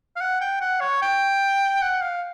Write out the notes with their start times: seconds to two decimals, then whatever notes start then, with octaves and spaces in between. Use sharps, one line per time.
0.16 F5
0.21 F#5
0.41 G5
0.61 F#5
0.81 C#5
1.02 G5
1.82 F#5
2.02 F5